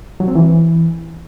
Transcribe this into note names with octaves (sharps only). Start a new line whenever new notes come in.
F#3
C4
E3